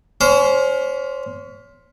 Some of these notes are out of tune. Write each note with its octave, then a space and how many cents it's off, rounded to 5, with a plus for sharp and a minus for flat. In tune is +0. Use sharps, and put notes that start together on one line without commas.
C#4 +30 C5 +0